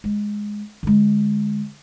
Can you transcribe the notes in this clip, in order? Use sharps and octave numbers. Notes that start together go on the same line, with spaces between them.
G#3
D3 G#3